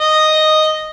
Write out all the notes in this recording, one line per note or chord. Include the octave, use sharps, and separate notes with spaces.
D#5